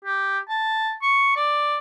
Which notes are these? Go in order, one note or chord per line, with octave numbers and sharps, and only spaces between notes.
G4
A5
C#6
D5